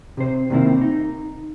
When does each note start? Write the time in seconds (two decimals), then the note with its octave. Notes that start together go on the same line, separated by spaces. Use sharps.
0.17 C3 C5
0.50 C3 D#3 A#3 C4 E4
0.81 D#4